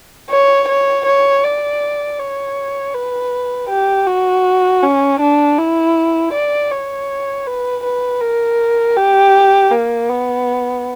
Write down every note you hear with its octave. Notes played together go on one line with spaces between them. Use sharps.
C#5
C#5
C#5
D5
C#5
B4
G4
F#4
C#4
D4
E4
D5
C#5
B4
B4
A#4
G4
A#3
B3